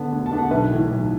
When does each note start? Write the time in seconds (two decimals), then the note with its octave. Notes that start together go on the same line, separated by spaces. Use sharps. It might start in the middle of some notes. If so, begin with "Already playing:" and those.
Already playing: D3 B3 D4
0.12 D2
0.26 A5
0.31 D3 B3 D4
0.38 F#5
0.51 B1 B4 E5
0.71 A2 E3
0.91 B1